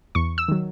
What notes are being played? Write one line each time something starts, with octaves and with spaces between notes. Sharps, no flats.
E2 C#6
E6
D#3 F#3